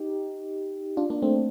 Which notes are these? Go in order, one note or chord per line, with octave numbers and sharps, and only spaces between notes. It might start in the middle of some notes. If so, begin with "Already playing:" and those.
Already playing: D#4 G4
D4 F4
A#3 D4
A3 C4